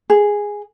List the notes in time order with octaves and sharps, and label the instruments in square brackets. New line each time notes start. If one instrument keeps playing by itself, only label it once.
[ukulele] G#4